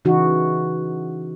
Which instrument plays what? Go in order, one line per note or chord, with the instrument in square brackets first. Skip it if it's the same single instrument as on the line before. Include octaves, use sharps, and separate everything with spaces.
[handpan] C#3 E3 D#4 F#4